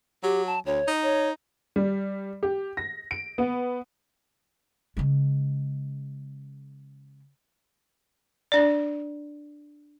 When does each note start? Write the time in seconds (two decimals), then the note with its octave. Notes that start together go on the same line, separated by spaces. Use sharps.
0.23 F#3 G4
0.46 A5
0.66 D2 C#5
0.88 D#4
1.03 C#5
1.76 G3
2.43 G4
2.77 A#6
3.11 D7
3.38 B3
4.97 C#3 G#3
8.52 D4 D5